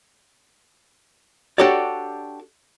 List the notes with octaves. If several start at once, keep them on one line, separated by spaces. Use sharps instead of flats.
D4 F#4 G4 A4 C#5 D5